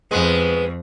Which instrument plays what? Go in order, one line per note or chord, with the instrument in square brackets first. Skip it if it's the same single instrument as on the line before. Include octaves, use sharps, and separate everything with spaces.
[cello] F2 [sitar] G#3 B3